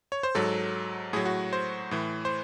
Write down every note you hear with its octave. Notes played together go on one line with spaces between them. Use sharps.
C#5
C5
G#2 F#3 A4
A2 F#3 G#4
F#4
C5
A2 E3
C5